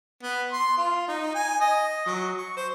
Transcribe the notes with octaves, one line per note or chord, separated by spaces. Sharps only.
B3
C6
F4
D#4
G#5
D#5
F#3
C#6
C5